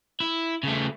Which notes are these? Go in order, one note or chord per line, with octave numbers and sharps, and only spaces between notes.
E4
C#3 A3